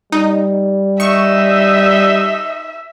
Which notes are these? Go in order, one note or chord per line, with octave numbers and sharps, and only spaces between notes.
G3 D#4
D#4 E5 C#6